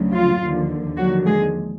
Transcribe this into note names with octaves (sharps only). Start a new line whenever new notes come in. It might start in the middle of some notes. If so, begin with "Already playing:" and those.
Already playing: D2 C#3 F#3
F3 F4
D#2 D3 F3
D#2 D3 F3 F#3 F#4
G#3 G#4